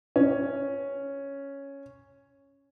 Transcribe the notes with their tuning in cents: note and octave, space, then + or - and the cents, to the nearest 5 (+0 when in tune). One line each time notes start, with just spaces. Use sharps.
C#4 +0